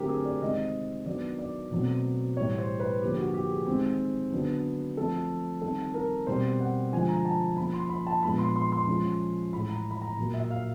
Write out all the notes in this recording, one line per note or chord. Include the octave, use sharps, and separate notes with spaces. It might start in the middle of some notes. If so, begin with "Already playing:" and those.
Already playing: D3 F#3 A3 C4 G4 A#4
G#4
D5
C3 D#3 G#3 C4 D#5
D#3 F#3 B3 D4 D5
D5
B2 F#3 A3 C4
A2 E3 G3 C#5
C5
B4
D3 F3 A#3 D4 G4
F#4
G4
G#4
D#3 G#3 C4
D3 F#3 B3 D4
F3 A3 C4 A4
D#3 G3 C4 A4
A#4
B2 G3 C4 C5
F#5
D3 F3 G#3 G#5
A#5
A5
F3 A#3 C#4 B5
C6
B5
A5
A#2 F3 G#3 B3 D4 B5
C6
C6
C6
F3 G#3 C#4
A2 E3 G#3 B5
A#5
B5
A#5
A#2 F#3 A#3
E5
F5